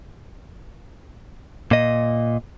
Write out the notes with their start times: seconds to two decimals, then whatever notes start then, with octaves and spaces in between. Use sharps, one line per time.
1.71 A#2 D#5